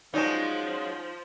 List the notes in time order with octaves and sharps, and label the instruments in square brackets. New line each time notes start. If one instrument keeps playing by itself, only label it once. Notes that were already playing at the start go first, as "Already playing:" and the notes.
[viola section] F3 C5 [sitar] F#3 G#3 C#4 [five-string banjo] D#4 D5 A5